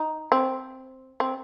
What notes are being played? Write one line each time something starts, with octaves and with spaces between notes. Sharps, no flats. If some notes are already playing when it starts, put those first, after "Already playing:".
Already playing: D#4
C4
C4